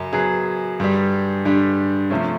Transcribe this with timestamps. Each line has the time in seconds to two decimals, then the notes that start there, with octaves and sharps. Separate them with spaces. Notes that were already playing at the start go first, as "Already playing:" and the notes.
Already playing: F#2 C#3 F#3
0.13 F#2 C#3 F#3 B3 G#4
0.80 G2 D3 G3
1.45 G2 D3 G3
2.10 C3 F3 A3 C#4